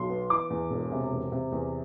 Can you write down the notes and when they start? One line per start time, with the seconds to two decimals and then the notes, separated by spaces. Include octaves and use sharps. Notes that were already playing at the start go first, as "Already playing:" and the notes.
Already playing: B1 C6
0.09 B3
0.30 E3 D6
0.50 E2
0.70 E1
0.92 C3
1.12 E2
1.32 C3
1.52 E2